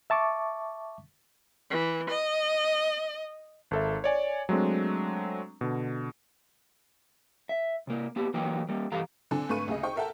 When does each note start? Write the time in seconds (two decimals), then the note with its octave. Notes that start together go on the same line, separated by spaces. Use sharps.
0.10 E5 A5 C#6 D6
1.71 E3
2.10 D#5
3.71 G#1 A4 E5
4.04 C#5 D5 G#5
4.49 F#3 G#3 A3 C4 D4
5.61 B2 D3
7.49 E5
7.87 C3 A#3
8.16 A#3 B3 G4
8.34 E3 F#3 A#3 D#4 G5
8.69 G3 A#3
8.92 G2 E3 G4 A4 F5 A#5
9.31 D3 C4 D4 G#5
9.49 G#1 A3 D4 B4 C#6 D#7
9.68 D2 C#3 G#4 D#5
9.83 D#4 C5 G5 C#6
9.96 A4 A#4 E5 F#5 G5 A5